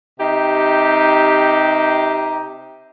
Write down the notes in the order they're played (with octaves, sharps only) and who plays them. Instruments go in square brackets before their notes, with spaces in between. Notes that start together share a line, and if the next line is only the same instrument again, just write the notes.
[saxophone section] C3 D#4 G4